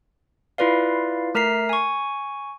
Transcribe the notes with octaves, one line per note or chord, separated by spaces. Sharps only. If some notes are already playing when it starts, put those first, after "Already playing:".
E4 F4 B4 D5 F5
A3 A#4 A#5 B6 C7
G#5 C#6